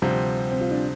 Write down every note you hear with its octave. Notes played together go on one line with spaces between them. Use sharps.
D2 C3 F3 G3
C4
F4
D4